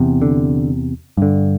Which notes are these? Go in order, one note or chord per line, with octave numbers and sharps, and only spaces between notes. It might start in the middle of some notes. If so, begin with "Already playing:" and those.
Already playing: E2 C3
D3
G2 D3